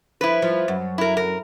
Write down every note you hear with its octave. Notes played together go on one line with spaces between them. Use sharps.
F3 E4 B4
F3
F#2
E4 A#4
A#4